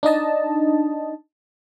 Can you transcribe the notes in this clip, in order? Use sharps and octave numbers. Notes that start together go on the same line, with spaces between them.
D4 D#4 D#5 A5